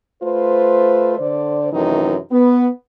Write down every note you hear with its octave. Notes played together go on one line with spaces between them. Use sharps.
A3 F4 B4 C5
D3 C5 D5
F#2 C3 D#3 E3 A3 D#4
B3